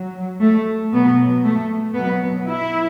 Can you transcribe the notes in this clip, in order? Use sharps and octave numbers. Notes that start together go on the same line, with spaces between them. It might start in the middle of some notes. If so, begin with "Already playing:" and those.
Already playing: F#3
A3
B2 F#3 B3
A3
B2 F#3 B3
E4